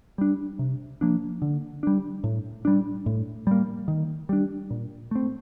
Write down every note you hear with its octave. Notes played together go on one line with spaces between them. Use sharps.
G3 D4
C3
F3 A#3 D4
D3
G3 D4
A2
G3 D4
A2
G3 A#3
D#3
G3 D4
A#2
A3 C4